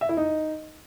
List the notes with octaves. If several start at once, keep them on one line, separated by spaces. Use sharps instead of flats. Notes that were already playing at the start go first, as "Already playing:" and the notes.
E5
E4
D#4